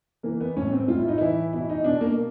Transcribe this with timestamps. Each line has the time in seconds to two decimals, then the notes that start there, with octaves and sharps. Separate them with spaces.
0.23 E3 A#3
0.40 B3
0.57 A2 C#4
0.73 C4
0.88 A2 F4
0.98 E4
1.08 D#4
1.18 E3 E4
1.53 B2 E4
1.69 D#4
1.84 B2 D4
2.01 A#3